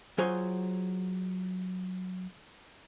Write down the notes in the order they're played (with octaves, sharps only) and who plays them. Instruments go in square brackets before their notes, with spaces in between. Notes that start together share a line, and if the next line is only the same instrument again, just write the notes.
[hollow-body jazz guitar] F#3 F4 G#4 C5 C#5